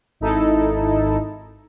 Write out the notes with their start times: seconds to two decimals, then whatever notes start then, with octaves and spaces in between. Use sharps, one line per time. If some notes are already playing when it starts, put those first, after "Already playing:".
0.20 G#1 D#4 E4 A4